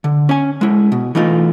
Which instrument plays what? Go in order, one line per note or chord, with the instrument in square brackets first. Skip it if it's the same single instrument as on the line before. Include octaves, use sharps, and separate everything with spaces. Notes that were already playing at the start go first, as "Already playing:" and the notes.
[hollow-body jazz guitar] D3
C#4 G#5
G#3 E4
B2
E3 A3 D#4 F4